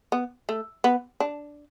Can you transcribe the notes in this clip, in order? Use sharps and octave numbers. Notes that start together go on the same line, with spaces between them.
B3
A3
B3
D4